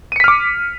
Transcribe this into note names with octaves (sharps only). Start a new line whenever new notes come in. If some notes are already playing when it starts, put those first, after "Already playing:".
D6 F6 B6 C#7 D#7